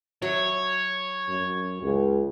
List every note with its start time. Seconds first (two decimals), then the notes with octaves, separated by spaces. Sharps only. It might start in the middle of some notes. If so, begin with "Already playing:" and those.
0.22 F#3 C#5 E5
1.29 F#2
1.83 C#2